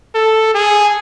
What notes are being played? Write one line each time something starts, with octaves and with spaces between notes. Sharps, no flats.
A4
G#4